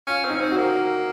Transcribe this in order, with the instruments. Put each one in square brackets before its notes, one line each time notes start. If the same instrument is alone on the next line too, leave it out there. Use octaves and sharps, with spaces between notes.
[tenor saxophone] C#4 [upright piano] F4
[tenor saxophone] C4 [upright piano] D#4
[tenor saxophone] C#4
C4
[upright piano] F#4
[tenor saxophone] A#3